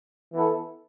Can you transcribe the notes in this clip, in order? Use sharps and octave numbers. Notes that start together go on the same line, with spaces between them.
E3 B3 E4 A4